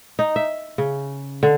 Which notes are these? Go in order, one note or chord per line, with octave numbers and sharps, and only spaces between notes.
D#4
E5
C#3
D3